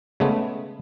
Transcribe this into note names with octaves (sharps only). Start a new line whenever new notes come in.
C#3 G#3 A3 B3